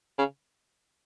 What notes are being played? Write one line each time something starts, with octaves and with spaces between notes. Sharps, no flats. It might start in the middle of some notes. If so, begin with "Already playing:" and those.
C#3